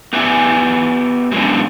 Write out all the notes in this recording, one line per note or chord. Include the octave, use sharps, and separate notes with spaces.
B3 G4 B4 D5 E5 G#5
F#3 G#3 A#3 B3 C#4 D4